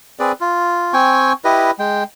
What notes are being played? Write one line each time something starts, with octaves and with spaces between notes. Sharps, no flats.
C4 G#4 B4 D5
F4
C4 G5 G#5 C#6
E4 G4 B4 D#5
G#3 G5